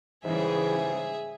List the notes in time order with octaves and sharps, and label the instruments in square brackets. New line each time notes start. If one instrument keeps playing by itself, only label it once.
[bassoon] G#2 [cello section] C#3 G3 [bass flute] E3 [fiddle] G#4 E5